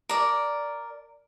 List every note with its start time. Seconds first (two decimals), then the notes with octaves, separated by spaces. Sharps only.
0.09 A#4 D5